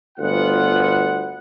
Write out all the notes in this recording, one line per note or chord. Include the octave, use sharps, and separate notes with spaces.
G1 D2 B3 F4 F#5